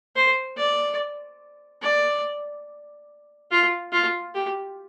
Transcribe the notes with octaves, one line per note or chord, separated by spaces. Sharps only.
C5
D5
D5
F4
F4
G4